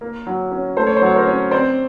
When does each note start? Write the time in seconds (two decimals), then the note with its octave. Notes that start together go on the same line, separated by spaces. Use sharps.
0.01 A#3
0.27 F#3
0.52 C#4
0.77 A3 C5
0.87 C#5
0.97 C5
1.02 F#3 C#5
1.16 A#4 C5
1.27 C#4
1.51 C4 C5 D5